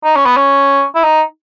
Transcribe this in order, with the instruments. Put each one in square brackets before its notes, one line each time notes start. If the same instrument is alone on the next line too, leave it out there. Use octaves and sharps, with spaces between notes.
[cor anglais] D#4
C#4
B3
C#4
E4
D#4